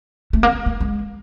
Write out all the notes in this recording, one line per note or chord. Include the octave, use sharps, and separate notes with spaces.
A3
A#3
B3
A#3
G#3